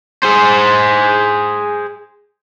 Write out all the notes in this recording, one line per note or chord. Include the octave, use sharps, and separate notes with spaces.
G#4 C5